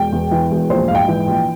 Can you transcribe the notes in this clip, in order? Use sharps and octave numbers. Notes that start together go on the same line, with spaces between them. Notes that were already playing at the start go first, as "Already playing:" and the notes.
Already playing: E1 G5
E2
E3
E1
A#1 C5
G#2 F5
G5
E3
A#1